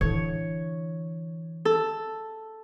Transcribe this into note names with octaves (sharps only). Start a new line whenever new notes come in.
D3 E3 C#5
A4